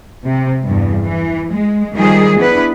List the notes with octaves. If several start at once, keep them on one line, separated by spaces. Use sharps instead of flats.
C3
E2 G2
E3
G#3
D#3 F3 G3 G#4
B3 D4 E4 B4